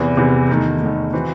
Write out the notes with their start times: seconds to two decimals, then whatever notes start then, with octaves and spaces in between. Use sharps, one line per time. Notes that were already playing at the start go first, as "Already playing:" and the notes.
Already playing: E2 C3 E3
0.17 E2 C3 E3
0.49 E2 D#3 A3 D#4
0.81 E2 D#3 A3 D#4
1.13 E3 C4 F#4